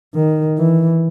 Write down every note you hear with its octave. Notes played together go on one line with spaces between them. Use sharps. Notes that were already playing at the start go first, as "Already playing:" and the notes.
D#3
E3